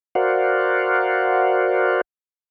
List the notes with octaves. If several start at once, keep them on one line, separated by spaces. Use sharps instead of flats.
F#4 A#4 C5 D5 F5 F#5